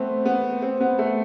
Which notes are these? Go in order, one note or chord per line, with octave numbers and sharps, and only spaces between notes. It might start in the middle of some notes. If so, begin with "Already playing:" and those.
Already playing: A3 B3 C4
B3
C4
B3
A3